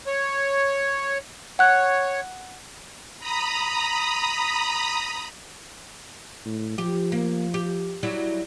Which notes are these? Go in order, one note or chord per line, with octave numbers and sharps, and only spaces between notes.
C#5
C#5 F#5 F#6
A#5 B5 D#6
A2
F3 G4
A#3
G4
F#3 G3 E4